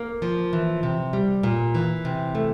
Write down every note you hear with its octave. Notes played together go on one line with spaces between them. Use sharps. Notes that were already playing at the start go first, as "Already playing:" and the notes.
Already playing: A#3
F3
E3
C3
G3
A#2
E3
C3
A3